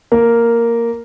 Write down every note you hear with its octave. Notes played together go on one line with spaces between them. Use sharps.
A#3 A#4